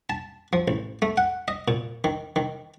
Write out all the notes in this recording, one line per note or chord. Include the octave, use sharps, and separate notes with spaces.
A5
F3
A1
A3
F#5
D#5
A#2
D#3
D#3